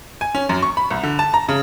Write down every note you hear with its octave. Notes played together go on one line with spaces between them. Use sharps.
G#5
C#4
F#2
C#6
B5
C2
D3
A5
A#5
C#3